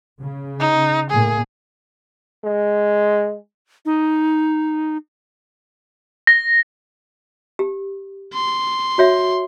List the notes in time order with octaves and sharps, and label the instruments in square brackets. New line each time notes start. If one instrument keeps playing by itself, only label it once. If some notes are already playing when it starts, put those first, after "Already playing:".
[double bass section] C#3
[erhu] D#4
[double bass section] A2 A#3 [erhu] G#4
[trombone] G#3
[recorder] D#4
[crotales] A#6
[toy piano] G4
[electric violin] C6
[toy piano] F#4 C#5 E5